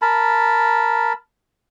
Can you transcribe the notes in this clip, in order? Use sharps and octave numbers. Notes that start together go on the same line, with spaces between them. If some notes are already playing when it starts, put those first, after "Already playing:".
A#4 A5 B5